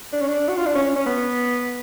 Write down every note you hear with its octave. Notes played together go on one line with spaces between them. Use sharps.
D4
C#4
D4
F#4
F4
D4
C#4
C#4
B3